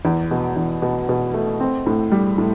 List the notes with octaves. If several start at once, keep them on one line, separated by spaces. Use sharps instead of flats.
E2
B2
E2
B2
B2
A3
C4
A2
G3
A2